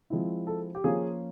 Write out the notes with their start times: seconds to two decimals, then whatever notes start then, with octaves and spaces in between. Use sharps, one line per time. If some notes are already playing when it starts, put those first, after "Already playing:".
0.10 F3 G#3 C4 E4
0.47 A4
0.75 G4
0.84 F3 A#3 C#4 F4 G#4